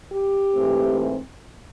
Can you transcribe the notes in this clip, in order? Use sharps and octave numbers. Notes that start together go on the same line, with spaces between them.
G4
G#2 E3 A3 C4